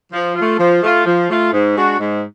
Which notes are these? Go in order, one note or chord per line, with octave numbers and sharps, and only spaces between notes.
F3
A3 F4
F3
A3 F4
F3
A3 F4
G#2
G#3 D4 F#4
G#2